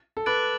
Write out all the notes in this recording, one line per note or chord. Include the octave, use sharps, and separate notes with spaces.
A4
B4 D6 F#6 A6 D7 F#7